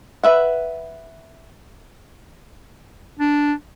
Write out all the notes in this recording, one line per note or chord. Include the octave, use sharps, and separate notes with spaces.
B4 E5 F#5
D4